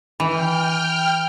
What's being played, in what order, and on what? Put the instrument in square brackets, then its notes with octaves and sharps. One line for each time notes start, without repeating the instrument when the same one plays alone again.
[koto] E3 [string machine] G5 F6